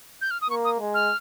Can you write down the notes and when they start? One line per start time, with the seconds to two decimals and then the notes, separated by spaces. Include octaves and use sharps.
0.21 G6
0.31 F6
0.41 D#6
0.50 A#3 C#6
0.64 D#6
0.79 G#3
0.94 F6